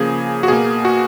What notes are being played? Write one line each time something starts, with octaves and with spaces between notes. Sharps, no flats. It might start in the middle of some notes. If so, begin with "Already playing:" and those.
Already playing: C#3 F3 A#3 G#4
F#4
B2 A#3 G#4
F#4